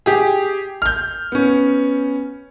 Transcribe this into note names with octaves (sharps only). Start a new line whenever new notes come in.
G4 G#4
F6 G6
B3 C#4